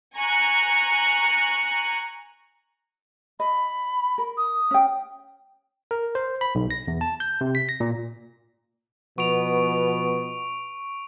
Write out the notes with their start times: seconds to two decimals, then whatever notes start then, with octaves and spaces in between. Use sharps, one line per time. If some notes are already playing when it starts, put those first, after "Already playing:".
0.14 G#5 A#5 C#6 F#6
3.40 D#5 B5
4.18 A#4
4.37 D#6
4.71 C#4 G5
5.91 A#4
6.15 C5
6.41 B5
6.55 B1
6.71 A#6
6.87 E2
7.01 A5
7.20 G6
7.41 C3
7.55 B6
7.69 A#6
7.80 A#2
9.18 B2 F3 B3 C#6 D7 F7